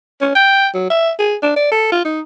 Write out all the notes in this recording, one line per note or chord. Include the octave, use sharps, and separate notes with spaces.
C#4
G5
F#3
E5
G#4
D4
D5
A4
F4
D#4